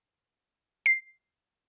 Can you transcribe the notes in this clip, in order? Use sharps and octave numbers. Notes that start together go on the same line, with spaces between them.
C7